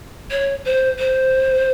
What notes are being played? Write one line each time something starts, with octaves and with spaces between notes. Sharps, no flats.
C#5
C5
C5